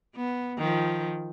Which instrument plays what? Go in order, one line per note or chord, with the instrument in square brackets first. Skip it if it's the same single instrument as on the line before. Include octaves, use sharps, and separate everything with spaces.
[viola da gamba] B3
D#3 F3